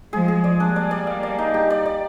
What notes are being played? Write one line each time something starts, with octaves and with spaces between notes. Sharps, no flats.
F3 G#3 G#4
G#4
D5
G3 A#3 D4
D5
D5
F5
D5
D#4
G4
D5
D5